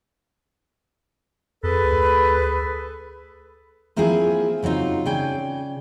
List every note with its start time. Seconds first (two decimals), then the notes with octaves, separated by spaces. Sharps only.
1.63 F2 G#4 A4 B4
1.84 D2
3.96 F3 A#3 C4 E4 F4 G#4
4.62 C#3 F#3 C4 D#4 F4
5.06 C#3 D5 G5 G#5